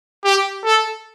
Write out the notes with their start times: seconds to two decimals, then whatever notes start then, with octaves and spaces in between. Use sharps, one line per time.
0.24 G4
0.64 A4